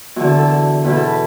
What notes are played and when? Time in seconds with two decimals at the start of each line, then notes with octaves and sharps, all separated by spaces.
0.16 E2 D3 F#4
0.27 A4
0.38 A4
0.50 A4
0.84 E2 B2 B4
0.96 A4
1.07 B4